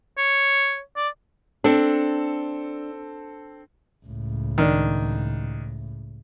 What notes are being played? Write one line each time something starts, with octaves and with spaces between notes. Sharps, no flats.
C#5
D5
C4 D4 A4
C#2 A2
D#3 D4